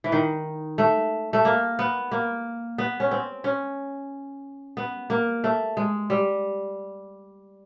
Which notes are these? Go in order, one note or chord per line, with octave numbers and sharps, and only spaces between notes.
E3
D#3
A3
A3
A#3
B3
A#3
B3
C#4
C4
C#4
B3
A#3
A3
G#3
G3